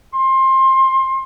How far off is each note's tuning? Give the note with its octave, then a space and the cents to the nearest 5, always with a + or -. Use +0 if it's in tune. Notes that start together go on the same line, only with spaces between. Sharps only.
C6 +25